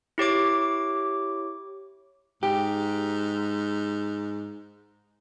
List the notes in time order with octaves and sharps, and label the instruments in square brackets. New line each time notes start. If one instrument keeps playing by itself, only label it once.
[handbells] E4 G4 C#5 D6
[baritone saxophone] G#2 [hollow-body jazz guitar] G4